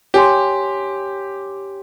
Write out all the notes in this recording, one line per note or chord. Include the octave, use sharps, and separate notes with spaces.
G4 C#5 G#5 C6